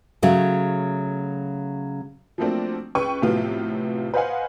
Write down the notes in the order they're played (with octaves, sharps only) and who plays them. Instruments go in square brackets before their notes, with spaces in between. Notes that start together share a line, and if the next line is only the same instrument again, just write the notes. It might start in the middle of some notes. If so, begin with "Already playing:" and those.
[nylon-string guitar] C#3 F#3 A3
[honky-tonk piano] F3 F#3 A3 A#3 C4 D4
C#2 B4 G5 C#6 D#7
A2 C3 F3 F#3 B3 F4
B4 C5 D#5 F5 F#5 G#5